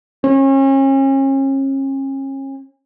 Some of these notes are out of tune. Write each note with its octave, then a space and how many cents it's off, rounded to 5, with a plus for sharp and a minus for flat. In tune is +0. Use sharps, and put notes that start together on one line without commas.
C#4 -35